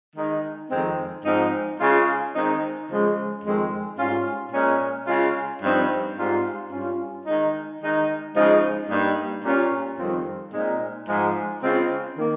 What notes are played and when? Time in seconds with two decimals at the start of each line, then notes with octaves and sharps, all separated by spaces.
0.16 D#3 G#3 D#4
0.70 F2 D#3 G#3 C4
1.25 G#2 F3 C4 D#4
1.80 C#3 G#3 C#4 F4
2.35 D#3 G#3 C4 D#4
2.90 C#3 F3 G#3
3.44 F2 D#3 G#3 C4
3.98 G#2 G3 C#4 F4
4.52 A#2 G#3 C#4
5.07 C#3 G#3 C#4 F4
5.62 G2 F3 C4 D#4
6.17 G#2 G3 C4 F4
6.71 G2 G3 C#4 F4
7.26 D#3 G#3 D#4
7.81 D#3 G#3 D#4
8.35 C#3 F3 G#3 D#4
8.90 G2 G3 A#3 D#4
9.44 A#2 G3 C#4 F4
9.99 F2 D#3 G3 C4 F4
10.52 A#2 G#3 C4 D#4
11.07 G#2 F3 G#3
11.62 C#3 G#3 C4 F4
12.18 D#3 A#3